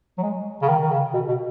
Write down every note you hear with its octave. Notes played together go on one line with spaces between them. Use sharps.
F#3
G#3
C#3
D#3
D#3
C#3
B2
B2